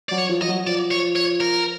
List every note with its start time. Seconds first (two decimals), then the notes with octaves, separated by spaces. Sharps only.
0.09 F#3 D5
0.18 C#5
0.29 F3
0.41 F3 D#5
0.49 F#3
0.67 F3 D5
0.91 C#5
1.16 C#5
1.40 A#4